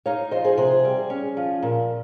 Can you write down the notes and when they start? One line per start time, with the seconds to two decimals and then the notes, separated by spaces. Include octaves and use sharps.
0.06 D#4 C#5 F5
0.31 F3 C5 D#5
0.44 G#4 C5
0.57 C3 G#4 C5
0.84 G3
1.10 C#4
1.37 F3
1.62 A#2